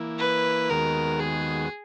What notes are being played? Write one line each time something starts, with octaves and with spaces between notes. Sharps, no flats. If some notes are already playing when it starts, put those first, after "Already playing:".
Already playing: E3 A#3 E4
B4
D#2 D#3 G#3 B3 F#4 A#4
G#4